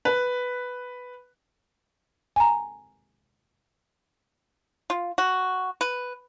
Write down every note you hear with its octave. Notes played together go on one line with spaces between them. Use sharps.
B4
G#5 A#5
F4
F#4
B4